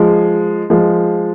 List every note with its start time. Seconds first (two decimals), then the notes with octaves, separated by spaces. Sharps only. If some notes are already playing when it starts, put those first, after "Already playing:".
Already playing: F3 G#3
0.70 F3 G#3